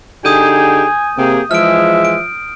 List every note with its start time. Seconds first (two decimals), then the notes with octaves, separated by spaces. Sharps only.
0.25 D3 D#4 G4 G#4 G#5 D#6 G6 D#7
1.17 C3 A#3 G4 G#4
1.51 E3 F3 G#3 E5 F6 D7
2.05 D7